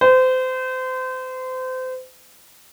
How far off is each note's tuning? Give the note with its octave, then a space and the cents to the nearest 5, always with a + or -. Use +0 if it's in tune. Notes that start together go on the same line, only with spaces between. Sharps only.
C5 -30